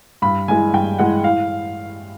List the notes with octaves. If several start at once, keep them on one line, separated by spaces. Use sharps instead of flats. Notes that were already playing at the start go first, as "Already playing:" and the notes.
G2 B5
E3 G#3 G#5
G2 G5
E3 G#3 F#5
A2 F5